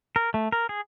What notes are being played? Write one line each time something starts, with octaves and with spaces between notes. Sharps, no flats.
A#4
A3
A#4
G#4